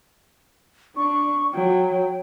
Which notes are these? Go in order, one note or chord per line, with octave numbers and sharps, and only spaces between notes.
D4 C#6
F#3 G5